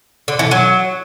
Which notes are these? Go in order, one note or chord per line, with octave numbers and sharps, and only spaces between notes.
D3
E3
F#3